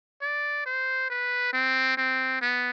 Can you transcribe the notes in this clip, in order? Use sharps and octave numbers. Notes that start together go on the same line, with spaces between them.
D5
C5
B4
C4
C4
B3